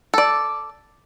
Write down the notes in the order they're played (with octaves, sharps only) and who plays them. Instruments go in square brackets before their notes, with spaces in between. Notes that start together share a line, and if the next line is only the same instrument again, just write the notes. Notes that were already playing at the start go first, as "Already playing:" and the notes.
[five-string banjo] A4 D5